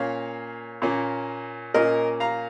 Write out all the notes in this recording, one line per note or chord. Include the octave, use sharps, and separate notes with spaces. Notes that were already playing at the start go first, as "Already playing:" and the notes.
Already playing: A#2 A#3 C#4 C#5 F5
A#2 A#3 C#4
A#2 A#3 C#4 A#4 D#5
F5 A#5